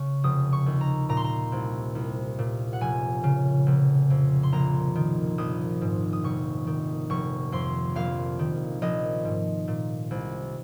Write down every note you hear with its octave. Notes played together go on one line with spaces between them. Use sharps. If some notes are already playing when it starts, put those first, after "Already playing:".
Already playing: C#3 C#6
F1 D#6
C#6
D#2
A#5
A#2 A#5
C6
A#5
C2
C2
A#2
F#5
F1 G#5
C#3
F1
F2
C6
A#1 A#5
D#3
A#1 D#6
G#2
D#6
F1 C#6
D#3
F1 C#6
F2 C6
A#1 F5
D#3
A#1 D#5
G#2
A#2
C2